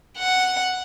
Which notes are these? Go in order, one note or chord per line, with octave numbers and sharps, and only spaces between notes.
F#5